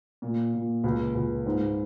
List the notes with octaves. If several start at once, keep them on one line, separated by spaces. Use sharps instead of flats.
A#2
A#2
C#2
C#2
G#2